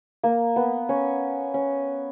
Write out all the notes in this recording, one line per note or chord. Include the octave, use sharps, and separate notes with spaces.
A#3
B3
C#4
C#4